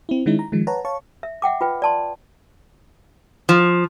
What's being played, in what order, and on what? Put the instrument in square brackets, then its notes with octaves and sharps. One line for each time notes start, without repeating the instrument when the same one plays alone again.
[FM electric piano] C4 E4
D#3 G#3 C#4 D#4 E4
A#5
D#3 F3 G#3
B4 C#5 F#5 A5 A#5
C#5 F5 A5 C#6
[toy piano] E5
E5 F#5 G5 D6
F4 B4 G5
D5 A5 C6
[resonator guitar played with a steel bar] F3